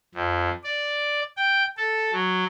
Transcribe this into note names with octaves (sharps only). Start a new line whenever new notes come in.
F2
D5
G5
A4
F#3